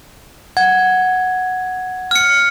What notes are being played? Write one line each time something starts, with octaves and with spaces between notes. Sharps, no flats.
F#5 G#6
F6 C#7